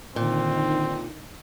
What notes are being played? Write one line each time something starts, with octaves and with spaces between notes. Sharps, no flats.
A#2 D3 D#3 C4 D#4